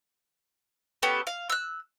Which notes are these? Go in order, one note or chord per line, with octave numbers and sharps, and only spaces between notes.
B3 C#4 G4 A4
F5
E6 F#6